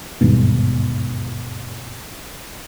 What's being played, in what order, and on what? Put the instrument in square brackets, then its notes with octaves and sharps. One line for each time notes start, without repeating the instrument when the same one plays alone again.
[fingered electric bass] G1 D#2 G#2 B2